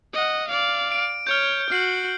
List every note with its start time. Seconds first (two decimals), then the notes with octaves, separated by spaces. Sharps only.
0.13 D#5 F#5
0.47 D5 F5
0.92 D7
1.27 C#5 F6 G6
1.70 F#4 F6 C7 F#7